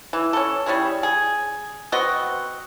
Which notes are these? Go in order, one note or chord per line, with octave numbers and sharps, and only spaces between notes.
E3
C#4 A4
G3 C#4 E4 G#4
G#4
B3 C4 F#4 D#5